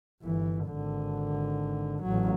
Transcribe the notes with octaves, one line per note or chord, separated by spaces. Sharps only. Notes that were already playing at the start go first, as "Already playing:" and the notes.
G1 E3
G#1 D3
A1 F#3